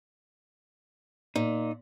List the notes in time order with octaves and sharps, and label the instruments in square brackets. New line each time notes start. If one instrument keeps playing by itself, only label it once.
[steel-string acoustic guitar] A#2 [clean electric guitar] D#4